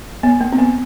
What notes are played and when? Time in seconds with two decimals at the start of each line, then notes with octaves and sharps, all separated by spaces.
0.23 B3
0.41 A#3
0.53 C4
0.59 B3